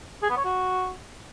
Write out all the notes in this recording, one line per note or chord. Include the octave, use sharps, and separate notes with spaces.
G#4
B3
C#5
F#4